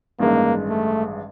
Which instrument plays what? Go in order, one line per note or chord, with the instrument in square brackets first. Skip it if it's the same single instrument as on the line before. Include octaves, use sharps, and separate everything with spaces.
[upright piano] A1 G2 D#3 G#3 [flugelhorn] A#3
[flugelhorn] A3